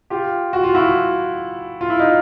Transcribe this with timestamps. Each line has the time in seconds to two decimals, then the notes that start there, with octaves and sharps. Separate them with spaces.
0.10 F4 G4
0.53 F#4
0.63 F4
0.75 E4 F#4
1.81 F4
1.90 E4
2.00 D#4 F4